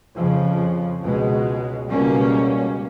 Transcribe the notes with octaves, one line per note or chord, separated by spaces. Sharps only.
F2 C#3 F3
C#2 B2 G#3
C#2 B2 G3 A#3 C#4